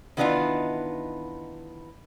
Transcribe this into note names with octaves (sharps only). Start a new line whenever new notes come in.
D#3 E3 B3 D4 D#4 F4